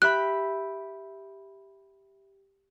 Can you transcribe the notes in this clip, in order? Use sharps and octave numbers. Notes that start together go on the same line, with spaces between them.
G4 E5 B5 F#6